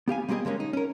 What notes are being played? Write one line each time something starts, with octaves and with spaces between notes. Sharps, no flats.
B3 G4 F5 G#5
G3 A#3 C4 G4 G#4 D#5
D3 G#3 A#3 C#4
D#4
C#4 A#4